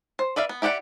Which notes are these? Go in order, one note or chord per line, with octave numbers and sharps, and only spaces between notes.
C5
B4 D5 E5 F5
B3
E4 G4 D5 F#5 G5